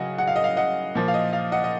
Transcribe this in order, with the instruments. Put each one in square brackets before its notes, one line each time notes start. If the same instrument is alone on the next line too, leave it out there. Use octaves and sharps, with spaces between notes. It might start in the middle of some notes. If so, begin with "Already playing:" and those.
Already playing: [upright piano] C#3 F#3 D#5 F#5 G#5
F#5
F5
D#5
F5
D#5 F#5
A#2 F3
F5
D#5
F5
D#5 F#5
D#5